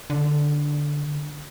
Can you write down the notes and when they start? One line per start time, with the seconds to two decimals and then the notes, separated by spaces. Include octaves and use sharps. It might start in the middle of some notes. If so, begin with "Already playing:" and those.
0.10 D3